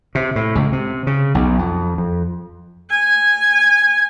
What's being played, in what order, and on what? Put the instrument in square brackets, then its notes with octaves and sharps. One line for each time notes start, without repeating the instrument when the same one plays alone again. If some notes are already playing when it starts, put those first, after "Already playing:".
[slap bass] C3
A2
C#2
C3
C#3
B1
F2
F2
[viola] G#5